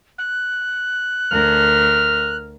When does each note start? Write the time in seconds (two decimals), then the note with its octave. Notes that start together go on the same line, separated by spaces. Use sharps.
0.18 F#6
1.31 D2 A#4 F6